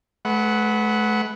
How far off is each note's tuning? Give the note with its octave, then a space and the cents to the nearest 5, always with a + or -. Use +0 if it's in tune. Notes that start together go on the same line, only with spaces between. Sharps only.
A3 -45 B4 +0 F#5 +0